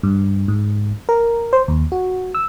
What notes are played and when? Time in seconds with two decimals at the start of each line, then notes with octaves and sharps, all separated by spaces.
0.03 G2
0.48 G#2
1.09 A#4
1.53 C5
1.68 D#2
1.92 F#4
2.35 E6